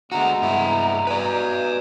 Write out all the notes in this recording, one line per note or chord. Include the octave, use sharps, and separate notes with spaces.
D3 G#3 B3 F#4 A#5
G2 E4
B2 B4 D5 G#5